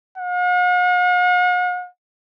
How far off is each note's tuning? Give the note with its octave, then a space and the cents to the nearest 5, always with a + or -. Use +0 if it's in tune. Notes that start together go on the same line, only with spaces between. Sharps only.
F#5 -45